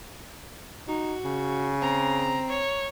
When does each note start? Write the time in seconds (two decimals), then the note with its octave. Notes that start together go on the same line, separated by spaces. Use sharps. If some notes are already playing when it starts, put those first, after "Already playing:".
0.88 D#4 F#4
1.24 C#3
1.82 C4 A#5
2.49 C#5